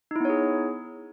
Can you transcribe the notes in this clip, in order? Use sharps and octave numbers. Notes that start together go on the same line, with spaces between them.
B3 D#4 E4 G#4 C#5